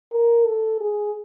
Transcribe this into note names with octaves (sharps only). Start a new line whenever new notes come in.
A#4
A4
G#4